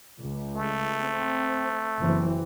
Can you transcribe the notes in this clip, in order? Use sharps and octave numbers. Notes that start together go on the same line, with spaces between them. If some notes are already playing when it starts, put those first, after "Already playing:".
C#2
A3
C4
F#1 E3 C4